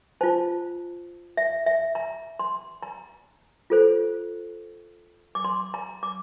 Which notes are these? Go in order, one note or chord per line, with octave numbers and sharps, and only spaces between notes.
F4 C5 A5
E5
E5
A#5
C6
A#5
F4 A4 C5
D6
C6
A#5
D6